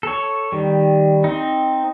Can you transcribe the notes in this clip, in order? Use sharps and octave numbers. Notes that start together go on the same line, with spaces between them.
A4 C#5
D#3 G3
C4 D#4